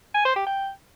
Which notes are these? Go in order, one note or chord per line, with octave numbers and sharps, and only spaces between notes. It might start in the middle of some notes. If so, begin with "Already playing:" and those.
G#5
C5
G4
G5